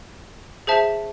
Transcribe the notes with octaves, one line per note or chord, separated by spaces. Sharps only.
G#4 C5 E5 A5